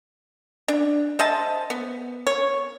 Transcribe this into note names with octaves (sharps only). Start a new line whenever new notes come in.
D4
C5 D#5 E5 A5
B3
C#5